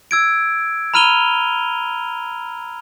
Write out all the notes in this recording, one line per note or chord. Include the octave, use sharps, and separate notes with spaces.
E6 G#6 D7
A#5 B5 F6 D#7 F7 G7